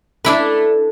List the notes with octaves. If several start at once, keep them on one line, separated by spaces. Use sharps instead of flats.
A3 D4 E4 B4